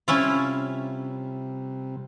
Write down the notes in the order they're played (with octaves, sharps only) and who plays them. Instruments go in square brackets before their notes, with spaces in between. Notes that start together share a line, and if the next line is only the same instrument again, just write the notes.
[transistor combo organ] C3 G3 [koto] C#4 E4 F4